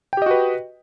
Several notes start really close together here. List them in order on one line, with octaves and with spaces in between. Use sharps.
G5 G4 D#5 F#4 B4